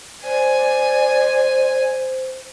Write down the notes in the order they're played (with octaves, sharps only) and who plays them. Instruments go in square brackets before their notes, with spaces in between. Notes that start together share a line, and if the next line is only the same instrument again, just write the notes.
[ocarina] C5 [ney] D5 [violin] G#5